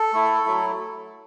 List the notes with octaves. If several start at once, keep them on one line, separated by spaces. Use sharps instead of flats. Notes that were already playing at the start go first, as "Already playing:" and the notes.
Already playing: A4
A3 E4
F#3 A3 E4